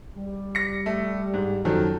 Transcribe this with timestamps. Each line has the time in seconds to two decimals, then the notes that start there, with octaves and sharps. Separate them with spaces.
0.16 G3
0.55 A#6 C#7
0.86 A3
1.34 G#2
1.65 F#2 D#3 F3 F#4 A4